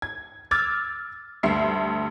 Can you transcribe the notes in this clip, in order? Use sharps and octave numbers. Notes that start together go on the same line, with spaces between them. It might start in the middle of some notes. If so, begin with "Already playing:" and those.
G#6
D6 E6 F6 G#6 A6
D2 G2 E5 C7